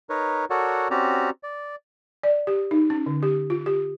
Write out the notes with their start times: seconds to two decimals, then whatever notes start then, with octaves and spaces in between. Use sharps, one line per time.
0.10 D#4 A#4 B4 C#5
0.50 F#4 A4 A#4 C#5 D5 F#5
0.91 C4 C#4 F#4 G4 D5 A#5
1.43 D5
2.23 D5
2.47 G4
2.71 D#4
2.90 C#4
3.06 D3
3.23 G4
3.50 F4
3.66 G4